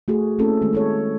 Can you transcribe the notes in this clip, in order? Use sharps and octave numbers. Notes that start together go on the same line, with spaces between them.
A3 F#4 G#4
A3 A#3 C4 C#4 E4 A4
D#3 G#3 A3
E4 A4 C#5